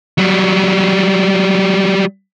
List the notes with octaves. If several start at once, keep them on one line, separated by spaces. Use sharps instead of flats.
F#3 G3